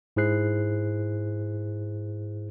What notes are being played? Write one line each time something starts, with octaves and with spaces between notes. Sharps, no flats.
G#2 E4 G#4 C5 F#6 C7